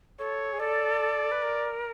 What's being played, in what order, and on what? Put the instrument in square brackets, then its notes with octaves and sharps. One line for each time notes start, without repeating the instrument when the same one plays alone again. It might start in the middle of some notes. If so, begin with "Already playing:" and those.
[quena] A4 [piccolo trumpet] C#5
[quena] G#4
[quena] A4 [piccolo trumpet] D5
[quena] B4
A#4